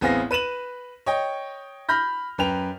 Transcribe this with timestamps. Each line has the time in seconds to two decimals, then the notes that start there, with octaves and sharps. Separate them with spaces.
0.01 A1 B3 C4 G#4 F5 A#6
0.31 B4 D#7 E7 F#7
1.06 C#5 D#5 G5
1.89 B5 F6 G6 A#6
2.38 F#2 B4 G5 F7